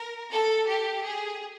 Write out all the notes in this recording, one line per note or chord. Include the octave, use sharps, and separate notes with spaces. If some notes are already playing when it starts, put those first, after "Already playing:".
Already playing: A#4
A4
G4
G#4